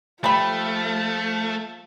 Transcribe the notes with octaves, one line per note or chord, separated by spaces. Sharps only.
F3 G3 A3 B5